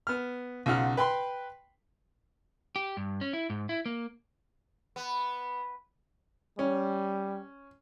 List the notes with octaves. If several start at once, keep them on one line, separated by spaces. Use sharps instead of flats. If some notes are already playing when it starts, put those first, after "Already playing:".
B3 F6
B1 C#3 F4 F#5 F6
B4 G5 B5 C6
G4
G2
C#4
E4
G#2
E4
A#3
B3
G3 C#4